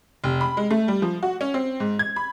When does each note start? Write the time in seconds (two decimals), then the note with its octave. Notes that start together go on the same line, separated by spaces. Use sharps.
0.24 F1
0.41 B5
0.57 G#3
0.71 A3
0.88 G3
1.02 F3
1.23 F#4
1.41 C#4
1.54 C4
1.80 G#2
1.99 G#6
2.16 B5